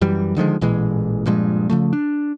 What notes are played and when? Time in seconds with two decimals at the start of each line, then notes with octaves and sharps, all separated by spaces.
0.01 F#2 E3 G3
0.36 D3 D#3 F3 G#3
0.61 A1 A#2 E3 G#3
1.26 G2 A#2 F3 G#3
1.70 C#3 F3 A3
1.93 D4